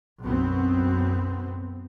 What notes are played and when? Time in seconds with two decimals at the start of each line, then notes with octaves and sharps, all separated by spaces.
0.23 B1 F#2 B3 C4